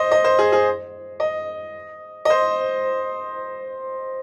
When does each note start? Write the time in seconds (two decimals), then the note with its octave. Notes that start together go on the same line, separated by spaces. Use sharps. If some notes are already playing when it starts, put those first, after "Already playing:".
Already playing: C5 D#5
0.11 D#5
0.24 C5
0.39 G#4
0.52 G#4
1.20 D#5
2.25 D#5
2.30 C5